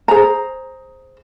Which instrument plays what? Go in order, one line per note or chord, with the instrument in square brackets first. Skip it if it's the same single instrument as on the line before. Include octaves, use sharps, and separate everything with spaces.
[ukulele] G#4 C5 A#5